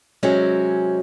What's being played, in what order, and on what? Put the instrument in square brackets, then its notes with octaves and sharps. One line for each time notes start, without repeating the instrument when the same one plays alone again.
[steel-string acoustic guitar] C3 F#3 G#3 C4 C#4